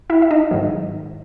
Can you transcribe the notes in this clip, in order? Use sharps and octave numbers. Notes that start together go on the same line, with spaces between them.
E4 E5
E5
D#4 D#5
G#2 D#3 F#3